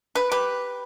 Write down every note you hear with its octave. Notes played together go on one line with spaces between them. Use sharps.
B4
G4 B4